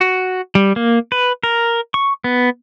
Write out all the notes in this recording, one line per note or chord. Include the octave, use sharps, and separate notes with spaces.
F#4
G3
A#3
B4
A#4
C#6
B3